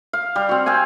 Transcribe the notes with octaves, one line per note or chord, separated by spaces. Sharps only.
F5
G3
C4 F#4
C4 G4 F5 G#5